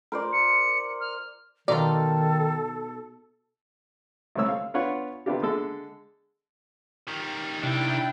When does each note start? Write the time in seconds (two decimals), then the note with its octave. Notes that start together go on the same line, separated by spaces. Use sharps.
0.12 A#4 C5 D5
0.33 C#7
1.01 F6
1.68 B2 D#3 D#4 F4 A4 D5
4.35 C2 C#3 G#3 A3 C#5 E6
4.48 F5
4.74 B3 D4 F4 B4 C#5 F#5
5.26 C3 B3 D4 F4 G4
5.42 D3 G#3 A4
7.08 D#3 G3
7.63 C3 D4 E4 G5